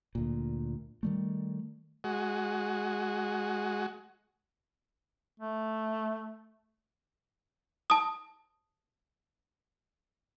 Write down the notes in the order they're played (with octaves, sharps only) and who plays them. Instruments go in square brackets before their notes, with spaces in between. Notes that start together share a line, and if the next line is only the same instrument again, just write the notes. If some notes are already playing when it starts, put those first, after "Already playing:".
[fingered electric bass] D2 A#2
D#3 G3 A3
[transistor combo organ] G#3 F#4
[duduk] A3
[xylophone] A5 D#6